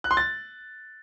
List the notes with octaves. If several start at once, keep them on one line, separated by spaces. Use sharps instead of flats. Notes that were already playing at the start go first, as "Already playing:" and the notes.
F#6
C6
A6